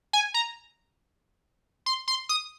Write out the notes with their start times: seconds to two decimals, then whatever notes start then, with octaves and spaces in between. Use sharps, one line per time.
0.13 G#5
0.34 A#5
1.86 C6
2.08 C6
2.29 D#6